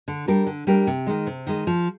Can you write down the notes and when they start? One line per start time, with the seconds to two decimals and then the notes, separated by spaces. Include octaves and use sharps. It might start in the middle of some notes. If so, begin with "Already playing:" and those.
0.08 D3
0.28 G3 D4 G4 A#4
0.47 D3
0.67 G3 D4 G4 A#4
0.87 C3
1.07 D#3 G#3
1.27 C3
1.47 D#3 G#3
1.67 F3